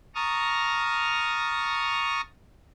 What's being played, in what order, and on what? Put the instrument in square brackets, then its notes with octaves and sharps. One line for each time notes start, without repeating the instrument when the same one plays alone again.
[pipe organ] A5 A#5 C#6 D#6 F6